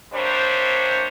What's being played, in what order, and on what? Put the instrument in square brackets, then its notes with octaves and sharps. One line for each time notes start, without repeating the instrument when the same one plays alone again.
[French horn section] C3 G3 A#3 D4 C5 C#5